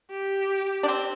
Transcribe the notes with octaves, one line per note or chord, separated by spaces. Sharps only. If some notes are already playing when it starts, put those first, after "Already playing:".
G4
D4
C4